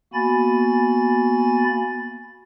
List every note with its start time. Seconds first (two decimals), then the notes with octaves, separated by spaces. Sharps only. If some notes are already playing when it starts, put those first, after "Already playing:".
0.14 A#3 B3 F#4 G#5 B5 A6